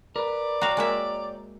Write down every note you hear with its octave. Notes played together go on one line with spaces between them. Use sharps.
A#4 B4 D5
F#4 C#5 F5 G5 A#5
G#3 A#3 E5